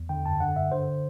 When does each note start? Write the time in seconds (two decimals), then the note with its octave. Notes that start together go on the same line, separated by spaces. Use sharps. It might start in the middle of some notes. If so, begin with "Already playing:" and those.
Already playing: E2
0.09 D3 G5
0.26 F#2 A5
0.40 D3 F#5
0.56 G2 E5
0.72 D3 C5